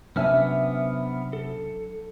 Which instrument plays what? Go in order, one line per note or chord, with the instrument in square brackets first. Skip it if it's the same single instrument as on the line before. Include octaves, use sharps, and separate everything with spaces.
[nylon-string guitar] C3 E5 G#5 [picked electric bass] F#3 C#4 D4 [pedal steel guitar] B3 F6
[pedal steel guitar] A4